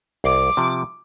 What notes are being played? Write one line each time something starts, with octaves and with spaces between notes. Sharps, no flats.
C2 D6
C3 F3